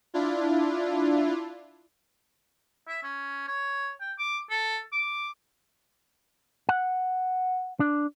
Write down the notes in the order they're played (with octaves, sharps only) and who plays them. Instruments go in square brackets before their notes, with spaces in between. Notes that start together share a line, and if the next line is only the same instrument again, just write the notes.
[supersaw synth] D4 E4 F4
[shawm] E5
C#4
C#5
G5
D6
A4
D6
[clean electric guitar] F#5
D4